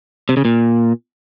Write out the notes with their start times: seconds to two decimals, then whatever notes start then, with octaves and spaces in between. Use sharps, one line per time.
0.29 C3
0.37 C#3
0.45 A#2